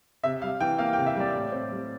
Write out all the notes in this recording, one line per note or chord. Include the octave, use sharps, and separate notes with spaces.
C3 E5
G3 F5
E3 G5
A#3 F5
G5
C3
E5
G3 D5
A2
C4
G3